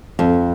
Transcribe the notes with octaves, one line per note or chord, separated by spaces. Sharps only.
F2